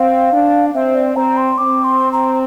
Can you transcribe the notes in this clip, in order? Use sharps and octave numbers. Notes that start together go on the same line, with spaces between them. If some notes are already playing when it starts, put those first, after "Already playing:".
Already playing: C4 F5
D4
C4 E5
D5
C4 A#5
C6
C4 D6
C6
A#5